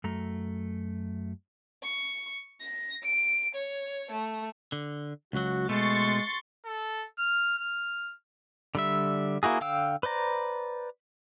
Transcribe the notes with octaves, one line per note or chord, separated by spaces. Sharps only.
F#2 A3 A#5
C#6
A#6
D7
C#5
A3
D3
C#2 F#3 F#4
B2 G#3 A3 C6 C#6 A6
A4
F6
F6
D3 G3 E5
A#3 E4 F#4 G#4
D3 F5 G5 E6
B4 C5 D5 A#5